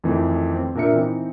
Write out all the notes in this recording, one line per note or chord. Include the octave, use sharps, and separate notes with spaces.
F2 D#3 E3 A3
C4
A#2 D4 A#4 E5 C#7
E3 C4 D#4